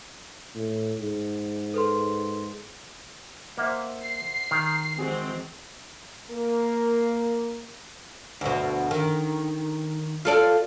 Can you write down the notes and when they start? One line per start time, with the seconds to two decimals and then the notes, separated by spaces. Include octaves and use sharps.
0.55 A2
0.99 G#2
1.74 A4 B4 C6
3.57 A#3 C5 E5 F#5
4.02 C7
4.51 D#3 F6
4.98 E3 G#3 C4 F#4 G#4
6.31 A#3 A#4
8.41 D2 B2
8.91 D#3
10.25 F4 A4 D5